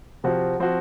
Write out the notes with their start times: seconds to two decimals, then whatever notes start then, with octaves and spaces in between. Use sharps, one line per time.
0.24 C3 F3 C4 F#4
0.60 F3 C4 F#4